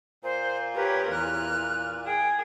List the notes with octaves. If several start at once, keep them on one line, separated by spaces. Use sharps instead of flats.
A#2 C5
G4 A#4 B4 C#5
E2 F6 F#6
G#4 G5